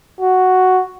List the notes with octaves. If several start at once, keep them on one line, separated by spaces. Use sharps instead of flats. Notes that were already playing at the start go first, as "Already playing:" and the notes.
F#4